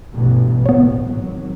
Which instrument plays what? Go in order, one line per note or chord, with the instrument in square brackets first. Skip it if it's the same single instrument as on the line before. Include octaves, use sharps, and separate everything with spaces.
[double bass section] A1 G2 B2
[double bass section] C#2 A2 [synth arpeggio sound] B3 C#5
[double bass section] G#1 F#3